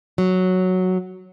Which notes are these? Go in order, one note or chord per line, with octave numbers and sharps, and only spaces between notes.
F#3